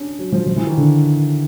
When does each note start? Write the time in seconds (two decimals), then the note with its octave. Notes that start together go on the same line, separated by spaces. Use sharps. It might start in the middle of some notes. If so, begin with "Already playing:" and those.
Already playing: C#4 D4
0.19 F#3
0.32 F3
0.47 F3
0.56 E3
0.67 D#3
0.77 D3